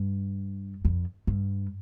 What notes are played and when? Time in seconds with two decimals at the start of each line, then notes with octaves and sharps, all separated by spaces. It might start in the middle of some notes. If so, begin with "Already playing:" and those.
Already playing: G2
0.85 F2
1.27 G2